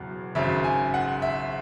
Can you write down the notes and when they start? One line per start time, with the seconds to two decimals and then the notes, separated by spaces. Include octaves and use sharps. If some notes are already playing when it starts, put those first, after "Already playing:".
Already playing: E1 E2 C#3 F#3
0.35 G#1 F#2 C#3 E5
0.64 G#5
0.94 F#5
1.22 E5